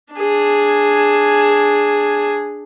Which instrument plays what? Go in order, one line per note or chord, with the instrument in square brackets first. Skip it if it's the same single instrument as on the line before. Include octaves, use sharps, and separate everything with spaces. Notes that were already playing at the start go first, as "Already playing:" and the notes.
[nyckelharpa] D4 G#4